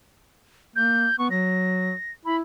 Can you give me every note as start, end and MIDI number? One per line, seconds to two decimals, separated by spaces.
0.76 1.08 58
0.76 1.16 91
1.19 1.30 59
1.19 1.28 85
1.31 1.92 54
1.31 2.11 94
2.25 2.42 64
2.25 2.36 83